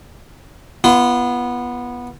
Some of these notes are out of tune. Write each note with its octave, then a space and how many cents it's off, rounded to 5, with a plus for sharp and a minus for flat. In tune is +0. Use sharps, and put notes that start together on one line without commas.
B3 -15 F4 -40